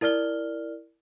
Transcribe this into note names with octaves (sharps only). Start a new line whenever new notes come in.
E4 A#4 D5 F6 G7